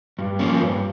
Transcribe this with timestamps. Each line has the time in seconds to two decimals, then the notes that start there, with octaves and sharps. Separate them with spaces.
0.19 G2
0.39 F3 A#3 C#4
0.61 G2